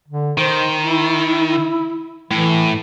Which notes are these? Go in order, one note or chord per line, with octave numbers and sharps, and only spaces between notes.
D3
D#3 C5
E4
A2 E3